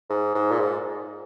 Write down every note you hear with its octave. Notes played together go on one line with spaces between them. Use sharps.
G#2
G#2
A#2
G#2